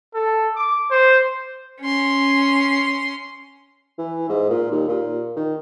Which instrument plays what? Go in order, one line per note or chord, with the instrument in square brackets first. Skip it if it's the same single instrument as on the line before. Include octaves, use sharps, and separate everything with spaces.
[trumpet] A4
D6
C5
[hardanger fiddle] C#4 C6
[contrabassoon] E3
G#2
A#2
D#2
A#2
D#3